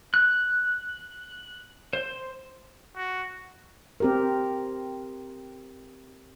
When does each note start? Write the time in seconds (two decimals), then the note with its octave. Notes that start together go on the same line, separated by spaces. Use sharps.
0.14 F#6
1.93 C5
2.97 F#4
4.00 C4 G4 A#4